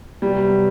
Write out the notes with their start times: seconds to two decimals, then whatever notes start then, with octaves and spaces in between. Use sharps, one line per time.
0.21 C3 F#3 G3 B3